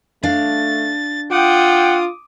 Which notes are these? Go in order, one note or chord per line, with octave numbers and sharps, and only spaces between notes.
A3 D4 F5 A6
F4 F#5 G5 D6 D#6